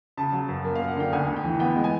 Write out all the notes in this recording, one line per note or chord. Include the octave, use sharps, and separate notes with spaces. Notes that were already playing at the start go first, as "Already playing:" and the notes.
C#3 A5
F#3
F#2
A#3
A#3 F5
F#5
D3 G5
D2 G#5
D2
G5
E3
B3 G5
G#3
G#5